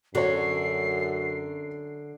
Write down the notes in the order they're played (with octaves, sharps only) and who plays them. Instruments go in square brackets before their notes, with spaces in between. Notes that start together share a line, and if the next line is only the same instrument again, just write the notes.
[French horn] F#2 [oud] D3 [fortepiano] F#4 C#5 [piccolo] C7